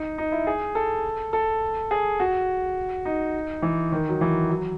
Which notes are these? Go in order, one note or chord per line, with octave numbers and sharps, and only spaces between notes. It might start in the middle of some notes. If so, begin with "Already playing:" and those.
Already playing: D#4
D#4
E4
G#4
A4
A4
G#4
F#4
D#4
E3
D#3
F#3
E3
F#3